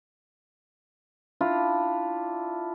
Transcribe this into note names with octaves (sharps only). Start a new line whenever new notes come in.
D4 E4 F4